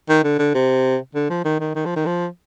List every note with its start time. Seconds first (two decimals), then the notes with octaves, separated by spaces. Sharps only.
0.09 D#3
0.24 D3
0.39 D3
0.54 C3
1.15 D3
1.30 F3
1.45 D#3
1.60 D#3
1.75 D#3
1.85 F3
1.96 D#3
2.06 F3